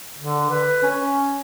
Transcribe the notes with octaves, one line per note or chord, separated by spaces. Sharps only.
D3
B4
C#4